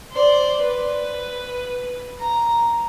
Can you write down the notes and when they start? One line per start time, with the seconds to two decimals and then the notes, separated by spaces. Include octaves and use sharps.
0.12 C5 D5
0.62 B4
2.19 A#5